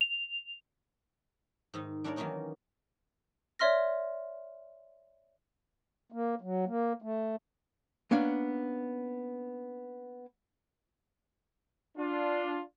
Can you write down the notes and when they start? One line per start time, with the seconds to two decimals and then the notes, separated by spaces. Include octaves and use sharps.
0.01 F7
1.74 G#2 D#3 D#4
2.04 G3 D4 E4 A#4 C#5 D5
2.16 D#3 E3 F#3 A#3 C#4 D#4
3.59 C#5 D5 E5 C6 F6 A#6
6.12 A#3
6.41 F#3
6.66 A#3
7.02 A3
8.11 A#3 B3 C#4 D4
11.97 D4 F4